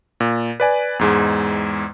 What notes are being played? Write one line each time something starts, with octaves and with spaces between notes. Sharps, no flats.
A#2
B4 D5 G#5
E2 G#2 G#3